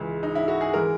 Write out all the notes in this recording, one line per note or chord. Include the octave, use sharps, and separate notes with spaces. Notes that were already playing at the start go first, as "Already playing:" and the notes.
Already playing: C#2 C#3 E3 G#3
D#4
E4
F#4
G#4
E3 G#3 A#4